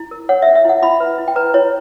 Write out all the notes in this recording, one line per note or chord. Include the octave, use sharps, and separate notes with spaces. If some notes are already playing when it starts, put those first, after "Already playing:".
Already playing: E4
A#4
C#5 F#5
E5
C#4
E5
E4 F#5
E4 B5
B4
E4
G5
B4 A#5
E4 C#5